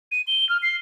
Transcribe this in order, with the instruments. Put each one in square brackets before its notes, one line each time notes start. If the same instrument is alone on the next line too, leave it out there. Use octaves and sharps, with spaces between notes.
[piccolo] D#7
G7
F6
C7